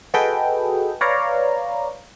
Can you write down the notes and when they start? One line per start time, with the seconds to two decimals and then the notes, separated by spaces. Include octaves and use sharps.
0.14 F#4 G#4 A4 B4 D#5 G5
1.01 B4 C#5 D5 F5 A#5